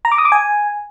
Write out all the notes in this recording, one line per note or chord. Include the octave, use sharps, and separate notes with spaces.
A#5
D6
D#6
D6
G#5